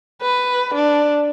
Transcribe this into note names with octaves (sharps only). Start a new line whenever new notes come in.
B4
D4